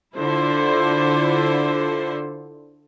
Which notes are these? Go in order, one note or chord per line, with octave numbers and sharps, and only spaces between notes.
D3 E4 F4 A4 C5